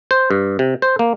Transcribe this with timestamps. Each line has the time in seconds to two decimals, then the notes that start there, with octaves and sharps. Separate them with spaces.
0.11 C5
0.31 G2
0.59 C3
0.82 C5
0.99 A#3